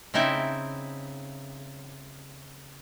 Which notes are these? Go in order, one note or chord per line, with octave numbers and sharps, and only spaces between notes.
C#3 C4 D#4 E4 E5 G5